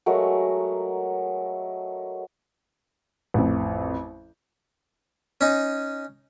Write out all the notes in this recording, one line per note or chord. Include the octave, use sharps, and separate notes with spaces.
F#3 G#3 A3 A#4
A1 F2
C#4 D#4